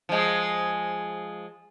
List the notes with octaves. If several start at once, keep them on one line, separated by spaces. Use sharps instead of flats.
F3 G#3